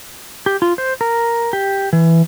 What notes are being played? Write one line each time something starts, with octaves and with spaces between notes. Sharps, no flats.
G4
F4
C5
A#4
G4
E3